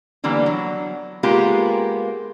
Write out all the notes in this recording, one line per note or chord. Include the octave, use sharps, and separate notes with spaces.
D3 E3 G3 A#3 B3
F#3
G#3 A#3 B3 F4 G4 A#4